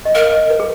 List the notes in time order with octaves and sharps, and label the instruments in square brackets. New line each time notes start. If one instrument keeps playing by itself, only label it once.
[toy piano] D#5
[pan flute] A#4 [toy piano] F5
[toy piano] D#5
B4
G#4